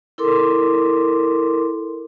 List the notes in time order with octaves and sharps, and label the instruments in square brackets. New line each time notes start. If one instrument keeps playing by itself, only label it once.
[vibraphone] E4 A4 A#4 C6 D6